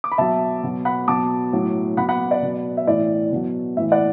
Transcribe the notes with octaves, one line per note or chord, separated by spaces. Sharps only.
D6
B5
B2 F#3 E5 A5
B2 F#3
F#5 B5
B2 F#3 A5 D6
A2 F#3
B2 F#3 F#5 B5
F#5 B5
D5
B2 F#3
E5
A2 E3 D5
B2 F#3
A2 E3 E5
D5 F#5